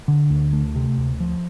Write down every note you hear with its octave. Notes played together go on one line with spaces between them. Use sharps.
D3
D2
A3
C3
D2
F3